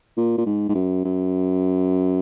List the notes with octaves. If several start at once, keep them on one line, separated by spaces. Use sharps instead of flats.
A#2
A#2
G#2
G#2
F#2
F#2